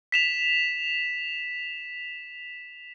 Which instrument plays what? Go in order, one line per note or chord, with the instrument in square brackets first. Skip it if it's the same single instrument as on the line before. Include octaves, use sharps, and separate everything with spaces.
[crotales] B6 E7 F7